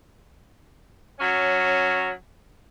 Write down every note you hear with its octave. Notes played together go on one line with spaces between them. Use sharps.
F#3 C#4